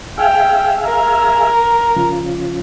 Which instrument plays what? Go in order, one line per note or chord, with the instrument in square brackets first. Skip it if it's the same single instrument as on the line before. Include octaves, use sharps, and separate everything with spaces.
[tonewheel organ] G#4 E5 F5 [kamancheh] G5
[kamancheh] A#4
[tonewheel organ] C#3 F3